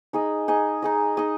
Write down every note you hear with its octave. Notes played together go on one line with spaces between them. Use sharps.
D#4 G#4 D#5
D#4 G#4 D#5
D#4 G#4 D#5
D#4 G#4 D#5